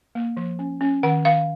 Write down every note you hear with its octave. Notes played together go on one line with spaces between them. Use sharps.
A#3
F3
C#4
C#4
D#3 F#5
D#3 F5